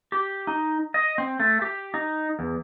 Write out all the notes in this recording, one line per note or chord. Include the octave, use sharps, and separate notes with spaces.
G4
D#4
D#5
C4
A3
G4
D#4
E2